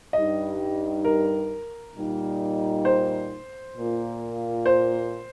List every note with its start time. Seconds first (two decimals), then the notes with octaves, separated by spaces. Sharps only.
0.13 G2 G3 D#4 G4 D#5
1.05 A#4
1.95 A#2 G3 D#4
2.85 C5
3.76 A#2 A#3 F4
4.66 C5